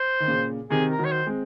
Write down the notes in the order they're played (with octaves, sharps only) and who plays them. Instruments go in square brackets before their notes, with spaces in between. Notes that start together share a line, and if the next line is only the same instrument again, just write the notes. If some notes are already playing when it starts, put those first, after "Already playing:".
Already playing: [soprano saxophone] C5
[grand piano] D#3
A#2 C#3
[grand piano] C3 D#3 [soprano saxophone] G#4
[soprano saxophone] A#4
[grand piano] D#3 F#3
[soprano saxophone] C#5
C5
[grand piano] G#3 C4